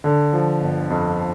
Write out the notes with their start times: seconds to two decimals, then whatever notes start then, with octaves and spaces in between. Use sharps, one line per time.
0.04 D3
0.33 F3
0.61 G1
0.90 F2